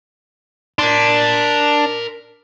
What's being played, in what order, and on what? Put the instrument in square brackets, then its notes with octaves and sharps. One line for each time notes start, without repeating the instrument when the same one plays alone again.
[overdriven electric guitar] D4 [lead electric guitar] A#4 C6